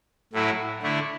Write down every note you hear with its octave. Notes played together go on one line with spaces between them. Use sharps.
A2 F#3 A3 E4
D3 A3 E4